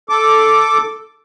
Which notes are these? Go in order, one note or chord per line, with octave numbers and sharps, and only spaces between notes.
A4 D6